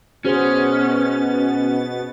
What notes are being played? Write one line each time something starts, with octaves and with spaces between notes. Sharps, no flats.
B2 B3 C#4 F#4 G#4 C5 A6